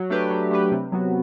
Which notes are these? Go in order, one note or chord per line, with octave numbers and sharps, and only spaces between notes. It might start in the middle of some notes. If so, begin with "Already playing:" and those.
Already playing: F#3
A3 D4 G4 B4
F#3
A3 D4 G4 B4
C3
F#3 B3 F#4